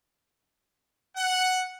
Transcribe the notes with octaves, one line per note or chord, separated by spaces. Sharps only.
F#5